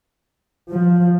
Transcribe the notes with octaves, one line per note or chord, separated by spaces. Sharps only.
F3